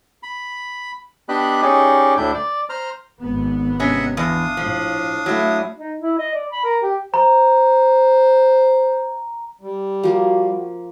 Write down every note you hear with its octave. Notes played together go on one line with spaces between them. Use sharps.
B5
B3 D4 G4 D#5 B5 F#6
C#4 D#4 G4 G#4 D5 D#5
D2 A2 D4 E4 G6
D5
C5 A#5 F6
G#1 B3
C3 C#4 D#5 E5 F#5
E2 D4 F5 D#6
A2 F3
F#3 A3 E4
D#4
E4
D#5
D5
B5
A#4
G4
C5 A#5
G3
F3 A#3 F#4